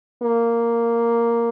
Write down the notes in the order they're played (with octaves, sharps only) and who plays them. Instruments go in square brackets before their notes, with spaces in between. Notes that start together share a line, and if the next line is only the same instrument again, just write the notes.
[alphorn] A#3